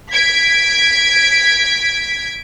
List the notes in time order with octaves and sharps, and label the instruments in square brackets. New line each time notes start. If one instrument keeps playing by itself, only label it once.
[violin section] G#6 B6 D7